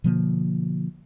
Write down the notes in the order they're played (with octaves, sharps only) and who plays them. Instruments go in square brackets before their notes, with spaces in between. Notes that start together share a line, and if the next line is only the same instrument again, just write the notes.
[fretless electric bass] B2 D3 F3 A#3